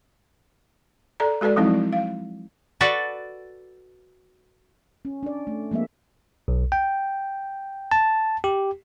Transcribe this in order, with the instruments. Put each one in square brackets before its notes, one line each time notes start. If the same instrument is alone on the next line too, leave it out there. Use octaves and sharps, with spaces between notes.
[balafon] A4 D5 A#5
G#3 F#4 A4 B4 D5
F3 F#3 G#3 C4 D#4 E4
F5
[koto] F#4 A4 B4 D5
[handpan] C#4
D4 D5
A3
F3 G#3 A#3 C4 E5
[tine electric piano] B1
G5
A5
G4